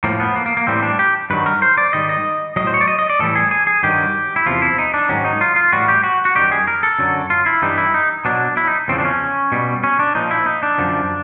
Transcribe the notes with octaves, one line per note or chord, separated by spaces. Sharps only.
A2 F3 A#3
B3
A#3
A#3
A#3
A2 E3 G3 C4
D4
G4
G2 D#3 F#3 B4
A#4
C5
D5
G#2 D#3 G3 D#5
D#5
A2 F#3 D#5
C5
C#5
D5
D#5
D#5
D5
A2 E3 G3 A4
G#4
G#4
G#4
G2 D#3 F#3 G4
E4
E2 C3 F3 F4
E4
D#4
D4
G#2 D#3 F#3 C#4
D#4
F4
F4
A2 E3 G3 F#4
G4
F#4
F#4
F#2 D#3 G3 G4
G#4
A#4
A4
F#2 D3 F#3
F4
E4
G2 E3 G3 D#4
E4
D#4
B2 F#3 D4
E4
D#4
E2 C#3 F3 C4
D4
C#4
B2 G3
C#4
D4
A#2 F3 D#4
E4
D#4
D4
F#2 D3 F3